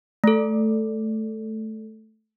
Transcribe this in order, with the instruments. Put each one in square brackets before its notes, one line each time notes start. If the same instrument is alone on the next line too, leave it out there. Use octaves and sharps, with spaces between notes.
[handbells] A3 A4